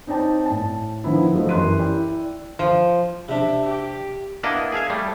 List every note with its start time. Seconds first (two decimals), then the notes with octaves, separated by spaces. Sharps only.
0.07 C4 D#4 C#5 D5 G5 A5
0.46 A2 A5
1.04 D3 D#3 F3 B3 E4
1.33 F3 F#3 A3 D#5
1.49 F#2 E3 G4 C6 F#6 D#7
1.79 E4 D5 G5
2.59 F3
3.29 C3 D4 E5
3.65 G4
4.43 A#3 B3 D4 E4 D5 D#5
4.72 G#4 E5 F5 G#5
4.90 G3 A3